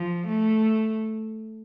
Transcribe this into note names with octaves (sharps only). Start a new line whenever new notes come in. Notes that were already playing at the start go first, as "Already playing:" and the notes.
Already playing: F3
A3